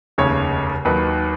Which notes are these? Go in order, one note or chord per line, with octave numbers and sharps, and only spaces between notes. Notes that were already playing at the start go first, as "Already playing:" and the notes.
F1 D#2 C#3 C#5
D#2 D#3 F#3 B4